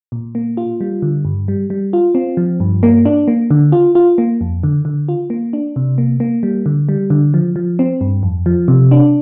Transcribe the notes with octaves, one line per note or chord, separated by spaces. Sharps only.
A#2
A#3
F4
G3
D3
G2
G3
G3
F4
C4
F3
G2
A#3
D4
A#3
D3
F4
F4
A#3
F2
D3
D3
F4
A#3
D4
C3
A#3
A#3
G3
D3
G3
D3
F3
F3
C4
G2
F2
F3
C3
D4